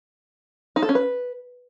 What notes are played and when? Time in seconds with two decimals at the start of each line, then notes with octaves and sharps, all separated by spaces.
0.76 D#4
0.82 A4
0.89 C#4
0.95 B4